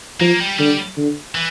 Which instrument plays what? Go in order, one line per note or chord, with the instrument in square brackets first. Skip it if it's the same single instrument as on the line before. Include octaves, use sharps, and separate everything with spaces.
[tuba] F3 [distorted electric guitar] A#3
[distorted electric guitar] G3
[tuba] D3 [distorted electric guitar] G3
[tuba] D3
[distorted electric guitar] E3